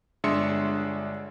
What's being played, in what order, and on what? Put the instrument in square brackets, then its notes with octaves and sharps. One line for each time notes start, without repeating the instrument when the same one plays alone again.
[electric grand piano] G1 G#3 D4 E5 C6 C#7